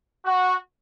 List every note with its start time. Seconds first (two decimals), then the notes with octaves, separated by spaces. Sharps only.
0.24 F#4